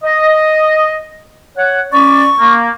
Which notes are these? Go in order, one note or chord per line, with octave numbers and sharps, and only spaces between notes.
D#5
C#5 F#5
C#4 D5 C#6
A#3